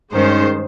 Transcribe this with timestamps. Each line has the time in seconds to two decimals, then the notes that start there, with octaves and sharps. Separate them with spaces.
0.13 G2 D#3 G#3 C#4 C5